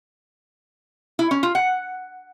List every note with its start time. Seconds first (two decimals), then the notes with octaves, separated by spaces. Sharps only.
1.19 E4
1.31 C#4
1.43 F4
1.55 F#5